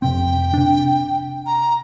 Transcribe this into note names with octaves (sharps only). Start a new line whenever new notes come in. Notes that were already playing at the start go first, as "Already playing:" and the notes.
F1 C3 C4 G5
C3 D4
A#5